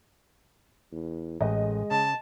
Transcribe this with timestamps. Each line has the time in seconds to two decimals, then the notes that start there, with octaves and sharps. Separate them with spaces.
0.92 E2
1.41 A1 G#3 D#5
1.91 C#3 A5